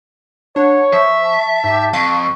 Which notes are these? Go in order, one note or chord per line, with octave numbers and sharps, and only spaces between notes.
D4 C#5 F#5
F3 E5 C#6
A5
G#2 G4
F2 F5 C#6